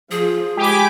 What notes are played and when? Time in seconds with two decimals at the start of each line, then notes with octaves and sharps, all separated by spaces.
0.11 F3 G#4
0.57 G#3 G4 G#5 B5 D6